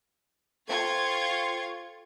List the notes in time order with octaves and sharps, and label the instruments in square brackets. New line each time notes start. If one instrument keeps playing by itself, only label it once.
[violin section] F4 C#6 G#6 [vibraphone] A4 C5 G5